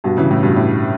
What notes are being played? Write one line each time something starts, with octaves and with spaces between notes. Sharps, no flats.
G2 B2
C#3 E3
A2
G2 B2
A2